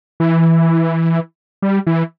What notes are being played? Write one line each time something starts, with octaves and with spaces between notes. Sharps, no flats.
E3
G3
E3